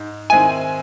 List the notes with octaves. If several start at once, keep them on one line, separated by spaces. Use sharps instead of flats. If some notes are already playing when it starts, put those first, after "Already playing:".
Already playing: G#2
D#3 G#3 C4 E4 G#5